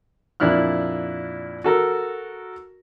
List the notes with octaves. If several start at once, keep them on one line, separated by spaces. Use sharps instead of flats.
F2 A#2 D4 E4 F6 F#6
F#4 A4 A#4